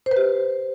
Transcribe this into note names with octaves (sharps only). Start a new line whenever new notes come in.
C5
B4
G4